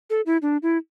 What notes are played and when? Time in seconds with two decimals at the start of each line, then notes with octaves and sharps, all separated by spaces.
0.10 A4
0.26 E4
0.42 D4
0.63 E4